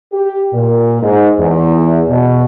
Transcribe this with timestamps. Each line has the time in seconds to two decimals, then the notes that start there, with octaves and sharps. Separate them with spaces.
0.13 G4
0.54 A#2
1.02 G#2
1.39 E2
2.09 B2